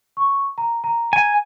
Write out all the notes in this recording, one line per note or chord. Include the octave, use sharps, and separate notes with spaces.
C#6
A#5
A#5
G#5